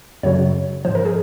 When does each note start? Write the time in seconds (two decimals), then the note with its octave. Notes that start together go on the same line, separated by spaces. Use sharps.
0.23 F#2 C#3 F#3 C#5
0.85 G#2 F3 C5
0.95 A#4
1.05 G#4